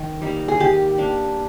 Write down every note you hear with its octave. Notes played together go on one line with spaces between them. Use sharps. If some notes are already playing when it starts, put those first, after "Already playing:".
Already playing: D#3
G3 A#3 D#4
G#4
D#3 G4
A#3 D4